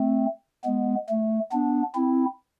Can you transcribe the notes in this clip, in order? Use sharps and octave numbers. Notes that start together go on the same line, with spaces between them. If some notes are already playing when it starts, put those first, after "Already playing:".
Already playing: A3 C4
G#3 B3
A3
B3 D4
C4 E4